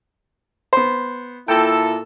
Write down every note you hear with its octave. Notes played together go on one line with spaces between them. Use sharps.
B3 C5
A#2 E4 A4 G5